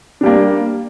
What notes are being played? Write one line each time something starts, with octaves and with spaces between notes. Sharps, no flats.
G3 A#3 D4